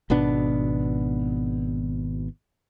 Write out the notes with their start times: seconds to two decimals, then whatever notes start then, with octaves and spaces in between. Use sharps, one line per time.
0.10 G#1 B2 B3 D4